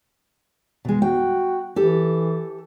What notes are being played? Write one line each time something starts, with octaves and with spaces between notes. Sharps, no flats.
B2 G#3
F#4 G5
E3 G4 A4